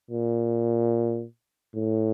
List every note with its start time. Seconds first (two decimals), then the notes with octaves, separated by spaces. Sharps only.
0.11 A#2
1.75 A2